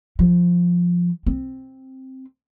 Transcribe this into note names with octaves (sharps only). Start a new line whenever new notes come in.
F3
C4